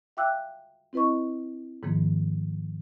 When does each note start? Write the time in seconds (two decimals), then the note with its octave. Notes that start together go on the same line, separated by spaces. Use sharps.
0.17 E5 F5 G5 D6 E6 F#6
0.93 C4 E4 B4 D#5 C#6
1.83 G#2 D#3 F3 A#3